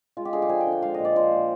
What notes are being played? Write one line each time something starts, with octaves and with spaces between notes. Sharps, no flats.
G#3 F4
G4
D3 G#4
G4
F3 G#4
G5
D3
G5
G#3 F5
A#2 D#5
D5
F3 C5
A#2